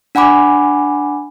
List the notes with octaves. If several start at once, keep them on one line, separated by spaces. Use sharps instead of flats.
D4 F#5 G#5 B5 D6